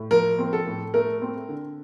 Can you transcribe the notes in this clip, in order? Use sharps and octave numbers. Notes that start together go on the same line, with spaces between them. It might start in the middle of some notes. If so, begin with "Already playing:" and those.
Already playing: A2
F3 A#4
C4
A4
A2
A3 A#4
C4
D3